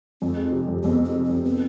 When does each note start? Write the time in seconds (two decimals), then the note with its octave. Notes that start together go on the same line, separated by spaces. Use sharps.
0.21 F2 C4
0.37 G#3
0.52 C3
0.68 F2
0.83 F2 B3
0.99 G#3
1.05 C4
1.14 C3
1.24 C4
1.30 F2
1.45 B3 C4